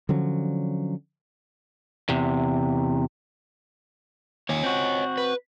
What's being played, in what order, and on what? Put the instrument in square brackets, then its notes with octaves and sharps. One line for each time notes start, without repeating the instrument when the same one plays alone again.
[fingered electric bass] D3 F3 F#3 C#4
[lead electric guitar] E2 C3
[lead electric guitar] D#2 [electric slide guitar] C#5 D#5 G#5
[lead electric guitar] C4 F#4
[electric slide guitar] B4